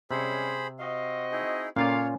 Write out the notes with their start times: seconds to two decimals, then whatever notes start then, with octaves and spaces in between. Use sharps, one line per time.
0.11 C3 G3 G#3 C#4 G#4 C5 B5
0.79 C4 F#4 D#5 F5
1.32 D#4 E4 G#4
1.76 A#2 A#3 C#4 F4 A4 C#5 D5 F5